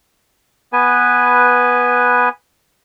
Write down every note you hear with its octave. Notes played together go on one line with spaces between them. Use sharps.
B3 B4 G#5